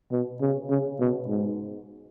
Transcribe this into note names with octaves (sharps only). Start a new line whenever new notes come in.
B2
C#3
C#3
B2
G#2